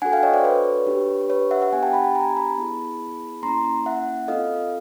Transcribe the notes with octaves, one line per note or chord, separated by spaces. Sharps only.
D4 F#4 A4 F#5 G#5
F5 G5
C#5 D#5
C5 D5
B4 C#5
D4 G4
B4 C#5
E5 F#5
E5 F#5
B3 D4 G4 F#5 G#5
G5 A5
A5 B5
A5 B5
G#5 A#5
A5 B5
B3 E4 G#4
A#3 C#4 E4 A#5 C6
E5 F#5
C4 F4 A4 D#5 F5